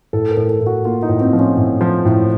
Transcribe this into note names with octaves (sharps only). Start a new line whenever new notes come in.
A2 A4
A#4
A2
A4
A2
F#4
A#3 F4
D#4
A2
C4
F3
C#4
A2
F3
A2